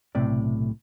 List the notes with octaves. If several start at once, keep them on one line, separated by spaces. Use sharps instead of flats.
B1 A2 C3 D5